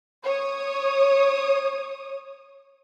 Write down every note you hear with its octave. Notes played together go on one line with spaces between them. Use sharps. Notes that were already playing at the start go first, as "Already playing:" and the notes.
C#5 D#6